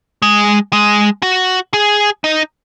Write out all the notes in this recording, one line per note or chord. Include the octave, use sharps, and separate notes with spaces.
G#3
G#3
F#4
G#4
D#4